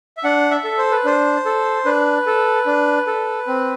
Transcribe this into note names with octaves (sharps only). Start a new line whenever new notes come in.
E5
D4 F#5
E5
A4
C5
B4
D4 C5
A4
D4 B4
A4
D4
A4
C4